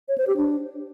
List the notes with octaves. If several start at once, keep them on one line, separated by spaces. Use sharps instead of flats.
C#5
C5
G4
D4